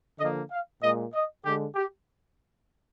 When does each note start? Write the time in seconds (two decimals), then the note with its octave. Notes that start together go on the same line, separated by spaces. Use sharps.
0.19 D3 F3 A#3 D#5
0.51 F5
0.82 A#2 G#3 D#5
1.14 D#5
1.45 D3 G#3 G4
1.75 G4